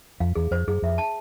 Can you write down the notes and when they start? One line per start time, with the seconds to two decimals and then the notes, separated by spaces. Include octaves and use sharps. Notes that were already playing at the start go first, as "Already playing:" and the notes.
0.20 F2 F5
0.35 E2 G#4
0.51 F2 C5
0.67 F#2 G#4
0.82 F2 E5
0.98 A5